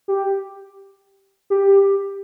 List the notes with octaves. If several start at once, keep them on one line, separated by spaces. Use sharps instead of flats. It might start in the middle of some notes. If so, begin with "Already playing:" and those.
G4
G4